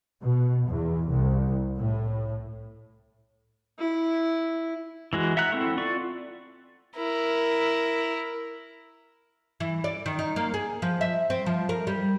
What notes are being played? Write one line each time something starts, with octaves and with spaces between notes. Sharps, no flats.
B2
E2
C2
A2
E4
E3 G#3 F#4
E5 F#5 A#5 F#6
C4 E4 A4 F#5 C#6
F4 D5 C#6
E4 A#4
E3
D5
D#3
D#4
A#3
G#4
F3
E5
C4
F3
A#4
G3